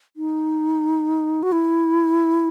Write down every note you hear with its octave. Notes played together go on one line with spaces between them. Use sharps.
D#4
F#4
E4